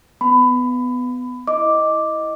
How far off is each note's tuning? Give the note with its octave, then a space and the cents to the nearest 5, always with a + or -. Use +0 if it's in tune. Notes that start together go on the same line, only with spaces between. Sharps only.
B3 +15 B5 +20
E4 -10 D#5 +0 D6 +0